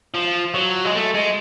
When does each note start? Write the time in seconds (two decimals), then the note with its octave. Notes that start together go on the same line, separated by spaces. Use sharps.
0.14 F3
0.54 F#3
0.85 G#3
0.95 A3
1.14 G#3